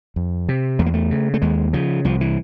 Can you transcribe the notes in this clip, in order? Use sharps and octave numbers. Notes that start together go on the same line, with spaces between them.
F2
C3
E2 A3
A#3
A3
C#3
A3
D#2 G#3
C#3 F3
C2 F3
E3